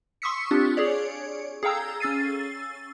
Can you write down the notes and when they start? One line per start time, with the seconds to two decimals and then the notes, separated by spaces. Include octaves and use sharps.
0.22 C6 C#6 D#6 E6 B6 C#7
0.51 C4 D4 F4 G4
0.77 G#4 C#5 D5
1.63 G#4 A4 F5 G5 A#5 E6
2.00 C#4 E6 A6 C7 D#7